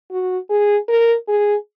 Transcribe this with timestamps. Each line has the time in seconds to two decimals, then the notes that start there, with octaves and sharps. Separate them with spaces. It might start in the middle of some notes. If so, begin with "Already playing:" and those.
0.11 F#4
0.50 G#4
0.88 A#4
1.28 G#4